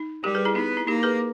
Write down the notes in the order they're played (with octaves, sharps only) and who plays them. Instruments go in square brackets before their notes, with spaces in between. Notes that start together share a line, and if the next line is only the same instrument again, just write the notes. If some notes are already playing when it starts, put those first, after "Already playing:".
Already playing: [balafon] D#4
[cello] G3 [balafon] G4 A#4
[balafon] G#4 B4
E4 G#4
[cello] B3 [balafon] D#4 G4
[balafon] E4
[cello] A#3 [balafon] D#4 G4
[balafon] G#4 B4